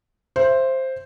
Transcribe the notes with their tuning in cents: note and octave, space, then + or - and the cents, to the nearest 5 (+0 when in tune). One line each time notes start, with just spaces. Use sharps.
C5 +5 E5 +25